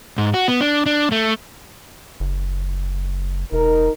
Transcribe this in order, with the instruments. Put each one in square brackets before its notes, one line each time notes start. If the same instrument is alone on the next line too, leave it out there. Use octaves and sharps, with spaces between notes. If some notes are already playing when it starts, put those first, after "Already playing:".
[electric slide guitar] G#2
F#4
B3
D4
D4
A3
[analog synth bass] F#1
[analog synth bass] E1 [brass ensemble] D#4 A#4